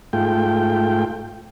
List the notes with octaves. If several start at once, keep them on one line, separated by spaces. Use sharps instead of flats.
G#2 A3 F4 G5